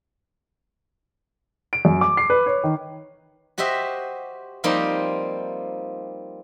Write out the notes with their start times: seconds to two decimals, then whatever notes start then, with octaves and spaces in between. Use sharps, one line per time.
1.73 D7
1.85 F#2
2.01 D6
2.17 C7
2.30 B4
2.46 C#5
2.64 D#3
3.58 F#4 G4 C5 D#5 E5
4.64 F3 G3 A#3 C4 D#4 G4